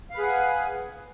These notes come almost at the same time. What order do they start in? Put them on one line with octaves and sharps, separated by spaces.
F5 B4 G#4 F#5 G#5